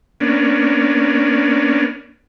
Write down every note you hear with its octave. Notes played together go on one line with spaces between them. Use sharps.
A#3 B3 C#4 D4